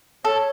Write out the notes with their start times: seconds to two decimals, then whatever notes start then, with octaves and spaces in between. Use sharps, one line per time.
0.24 A4 C#5